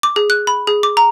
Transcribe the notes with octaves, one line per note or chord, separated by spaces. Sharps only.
D6
G#4
F#6
B5
G#4
D6
A#5